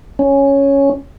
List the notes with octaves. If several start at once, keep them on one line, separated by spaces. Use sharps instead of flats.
C#4